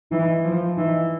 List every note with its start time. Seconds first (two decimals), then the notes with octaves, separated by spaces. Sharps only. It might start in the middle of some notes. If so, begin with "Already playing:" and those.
0.11 E3 D#4
0.44 F3
0.77 E3 D#4